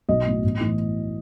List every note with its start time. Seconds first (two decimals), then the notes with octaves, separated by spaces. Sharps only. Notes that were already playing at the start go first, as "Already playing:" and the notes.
0.08 B1 D#5
0.26 A2 F#3
0.44 A1
0.61 A2 E3